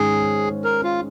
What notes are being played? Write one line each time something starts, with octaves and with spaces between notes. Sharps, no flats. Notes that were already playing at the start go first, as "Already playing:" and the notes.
Already playing: G#2 D#3 G#3 C#4 G#4
A#4
F4